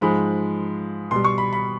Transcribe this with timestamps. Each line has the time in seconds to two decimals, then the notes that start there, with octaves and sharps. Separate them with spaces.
0.01 G#2 F3 G#3 B5
1.11 B2 G3 C6
1.24 C#6
1.38 B5
1.53 B5